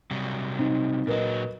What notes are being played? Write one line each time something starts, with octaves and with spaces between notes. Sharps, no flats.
C3 F#3 G3
C4 D#4
A#2 F#3 A#4 B4 D#5